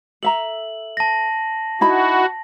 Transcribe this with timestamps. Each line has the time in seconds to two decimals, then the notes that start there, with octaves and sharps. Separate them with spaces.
0.23 A4 E5 A#5 F#7
0.97 A5 A#6
1.81 D#4 E4 F#4 B5